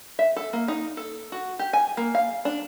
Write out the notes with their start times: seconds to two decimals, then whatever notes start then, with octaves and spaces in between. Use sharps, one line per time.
0.19 E5
0.36 A4
0.53 A#3
0.68 D#4
0.97 A4
1.32 F#4
1.59 G4
1.73 G#5
1.97 A#3
2.15 F5
2.45 D4